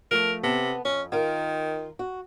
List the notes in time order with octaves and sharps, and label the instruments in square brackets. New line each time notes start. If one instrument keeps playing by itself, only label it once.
[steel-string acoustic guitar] F3 A3 [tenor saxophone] A#4
[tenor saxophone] C3 [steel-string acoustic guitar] B3 A5
[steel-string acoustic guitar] F2 [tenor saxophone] C#4
[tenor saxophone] D#3 [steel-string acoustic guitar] F4 A#4
[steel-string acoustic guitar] F#4